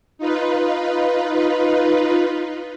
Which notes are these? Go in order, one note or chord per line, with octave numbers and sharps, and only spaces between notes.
D#4 F4 B4